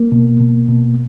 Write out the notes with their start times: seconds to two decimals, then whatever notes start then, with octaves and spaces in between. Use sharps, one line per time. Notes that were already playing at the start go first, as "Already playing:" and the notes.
Already playing: A#3
0.12 B2
0.40 B2
0.69 B2